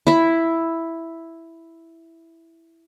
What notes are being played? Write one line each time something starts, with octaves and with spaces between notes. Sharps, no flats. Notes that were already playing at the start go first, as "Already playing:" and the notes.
E4 E5